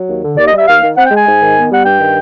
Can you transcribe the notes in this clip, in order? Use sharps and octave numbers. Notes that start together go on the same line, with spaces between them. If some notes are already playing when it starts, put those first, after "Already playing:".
Already playing: F#3
D#2
D3
D#2 D5
D#5
G3
E5
D#2 F5
D#3
C4 F#5
G5
G#3
G#5
G#2
D#3
B3
G3 F#5
G2 G5
D#3